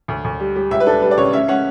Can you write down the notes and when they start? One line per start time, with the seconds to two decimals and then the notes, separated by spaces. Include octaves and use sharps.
0.08 D2
0.24 D2
0.40 G3
0.56 G3
0.71 C#2 E5
0.80 B4
0.87 D4 A4
1.02 G3 B4
1.11 D5
1.18 C#3 C#5
1.33 C#4 E5
1.48 C#4 F#5